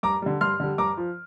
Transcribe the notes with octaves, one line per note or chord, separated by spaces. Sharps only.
G2 A#5 D6
D3 G3
G2 C6 F6
D3 G3
G2 A#5 D6
F3